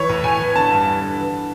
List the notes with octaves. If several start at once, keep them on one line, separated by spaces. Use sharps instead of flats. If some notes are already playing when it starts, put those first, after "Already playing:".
Already playing: E3 C#5
A2
A2 G#5
E3
D3 A5
G2
G2
D3
E3